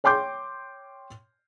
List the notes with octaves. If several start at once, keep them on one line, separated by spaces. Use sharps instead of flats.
C#5 G5 C6 D6 G6